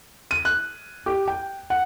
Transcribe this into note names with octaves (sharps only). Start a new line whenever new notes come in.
D#7
F#6
G4
G5
F#5